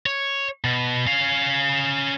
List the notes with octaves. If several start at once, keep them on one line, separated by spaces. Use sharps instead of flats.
C#5
B2
C#4 F5